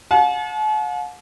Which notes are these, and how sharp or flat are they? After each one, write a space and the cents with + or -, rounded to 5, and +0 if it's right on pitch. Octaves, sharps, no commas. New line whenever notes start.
F#5 -45 A5 -45